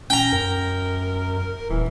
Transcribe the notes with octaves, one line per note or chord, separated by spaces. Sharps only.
C#4 G5 A#5
F#2 A#4
D#1 E3